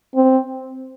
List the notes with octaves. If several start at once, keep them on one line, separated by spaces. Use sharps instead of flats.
C4